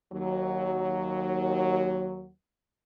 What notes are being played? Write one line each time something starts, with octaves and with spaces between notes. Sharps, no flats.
D#2 F#3